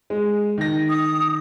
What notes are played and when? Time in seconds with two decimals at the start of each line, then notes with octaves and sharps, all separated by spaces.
0.10 G#3
0.58 D#3 A#6
0.89 D#6